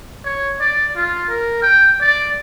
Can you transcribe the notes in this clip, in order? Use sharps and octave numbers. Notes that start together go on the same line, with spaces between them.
C#5
D5
F4
A#4
G5
D5